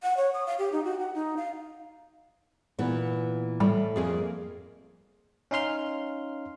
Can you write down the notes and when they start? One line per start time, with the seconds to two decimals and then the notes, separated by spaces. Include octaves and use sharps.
0.03 F#5
0.17 C#5
0.34 D#6
0.46 F5
0.59 G4
0.72 D#4
0.84 F#4
0.99 F#5
1.14 D#4
1.37 F5
2.79 A#2 E3 B3
3.60 A2 G3
3.96 F2 A#3 G#4 D5
5.51 C#4 D#4 F5 C6 F6